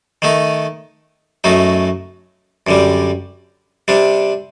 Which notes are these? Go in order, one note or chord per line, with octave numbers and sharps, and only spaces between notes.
D#3 A3 D#4
F#2 F#3 A3 D#4
F#2 D3 G3
C3 G3 D4